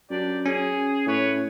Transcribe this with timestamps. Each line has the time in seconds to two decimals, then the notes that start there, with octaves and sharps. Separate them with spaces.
0.10 F#2 D4 G4 D5
0.46 C#4 G#4
1.07 A2 B4 C#5